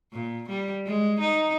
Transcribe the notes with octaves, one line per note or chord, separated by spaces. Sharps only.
A#2
G3
G#3
D#4